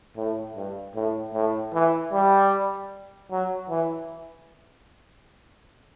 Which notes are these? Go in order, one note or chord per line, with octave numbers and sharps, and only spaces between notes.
A2
G2
A2
A2
E3
G3
F#3
E3